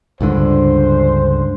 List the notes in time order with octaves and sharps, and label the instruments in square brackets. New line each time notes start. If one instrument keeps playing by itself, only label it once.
[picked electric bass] C#2 G2 D3 [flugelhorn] C5